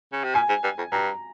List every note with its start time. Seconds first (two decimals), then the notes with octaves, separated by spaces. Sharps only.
0.12 C#3
0.24 C3
0.35 A#2 G#5
0.49 G#2
0.63 G2
0.78 F2
0.92 G2 A#5